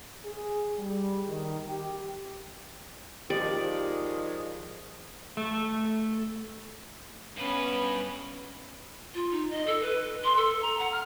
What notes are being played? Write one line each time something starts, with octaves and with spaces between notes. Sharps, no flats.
G#4
G3
D#3
G4
D#3 F3 G#3 G4 D5
A3
G2 B3 C#4 B4
F4
D#4
D#5
A4
B4
C6
A4
A#5
F#5
F6